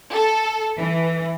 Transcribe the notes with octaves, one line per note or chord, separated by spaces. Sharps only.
A4
E3